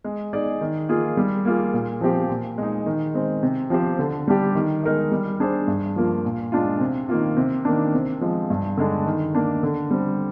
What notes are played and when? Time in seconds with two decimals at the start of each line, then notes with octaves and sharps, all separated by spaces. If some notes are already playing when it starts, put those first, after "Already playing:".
0.04 G#3
0.33 D#4 G#4 D5
0.61 D#3
0.89 A#3 F4 G#4
1.17 G3
1.45 A#3 F4 G#4
1.74 A#2
2.01 F3 C4 G4
2.30 A#2
2.58 G#3 D#4
2.86 D#3
3.14 G#3 C4
3.43 C3
3.70 F3 C4 G4 C5
3.99 D3
4.28 G3 D4 G4
4.55 D#3
4.83 G#3 D#4 A#4 D#5
5.12 G3
5.40 D4 G#4 C5
5.67 G2
5.96 F3 A#3 F4
6.25 A#2
6.52 G#3 D4 F4
6.80 C3
7.09 D#3 A#3 F4
7.37 C3
7.65 D#3 A#3 D4
7.94 C3
8.21 F3 G#3
8.50 G2
8.77 D3 G#3 D4
9.06 D#3
9.35 A#3 D4
9.63 D3
9.91 G3 C4